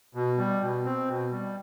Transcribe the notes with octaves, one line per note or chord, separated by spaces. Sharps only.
B2
G3
B2
C4
B2
G3